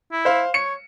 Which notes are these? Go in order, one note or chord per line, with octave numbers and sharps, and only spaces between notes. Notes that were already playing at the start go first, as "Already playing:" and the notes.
E4
C5 F5
C#5 C#7